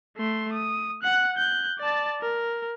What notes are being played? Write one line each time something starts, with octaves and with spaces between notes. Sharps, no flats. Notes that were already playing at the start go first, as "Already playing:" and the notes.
A3 C6
D#6
F#5 F#6
F#6 G6
D5 A5
A#4